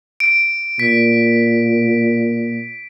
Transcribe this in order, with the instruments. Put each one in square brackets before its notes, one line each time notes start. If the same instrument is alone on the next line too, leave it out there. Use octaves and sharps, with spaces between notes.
[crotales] D7
[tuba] A#2 [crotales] B6